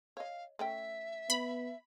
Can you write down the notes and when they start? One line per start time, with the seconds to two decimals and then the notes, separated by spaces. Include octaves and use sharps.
0.17 C#5 D#5 F5
0.59 A3 C#4 E5 G5
1.30 B3 B5